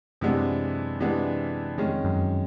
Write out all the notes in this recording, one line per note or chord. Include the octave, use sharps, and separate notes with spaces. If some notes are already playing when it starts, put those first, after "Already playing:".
F#2 C3 E3 G#3 B3 D4
C3 E3 G#3 B3 D4
F2 D#3 G#3 C#4
F#2